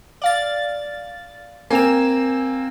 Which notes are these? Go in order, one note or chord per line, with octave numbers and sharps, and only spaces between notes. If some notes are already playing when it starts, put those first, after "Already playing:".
D5 F5 A6
A#3 C4 G#5 E7